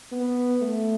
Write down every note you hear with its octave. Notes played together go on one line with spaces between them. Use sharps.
B3
A3